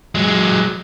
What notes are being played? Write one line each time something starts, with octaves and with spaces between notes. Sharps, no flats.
F#3 G#3